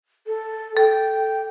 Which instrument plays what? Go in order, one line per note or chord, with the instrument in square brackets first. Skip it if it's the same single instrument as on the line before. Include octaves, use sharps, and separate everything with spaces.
[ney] A4
[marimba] A4 [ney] G5